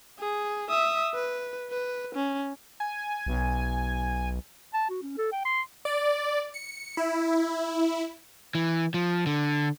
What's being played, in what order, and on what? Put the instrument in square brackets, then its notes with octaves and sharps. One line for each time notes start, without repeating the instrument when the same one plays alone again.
[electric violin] G#4
E5 D#6
B4
B4
C#4
[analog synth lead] G#5
[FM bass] B1
[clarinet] A5
F#4
C#4
A4
G5
C6
[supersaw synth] D5
C#7
E4
[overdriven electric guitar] E3
F3
D3